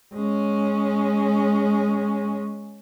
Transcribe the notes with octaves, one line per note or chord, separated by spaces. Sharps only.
G#3 C#4